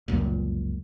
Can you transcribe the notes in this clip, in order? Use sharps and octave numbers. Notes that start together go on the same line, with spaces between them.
G1 C#2 F#2 A#2